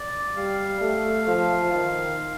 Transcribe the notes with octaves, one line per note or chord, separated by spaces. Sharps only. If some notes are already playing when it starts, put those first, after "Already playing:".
Already playing: D5
G3 F5
A3
F3
D#3